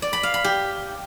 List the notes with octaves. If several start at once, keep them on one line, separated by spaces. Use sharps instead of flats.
D5
B5
F5
B5
G4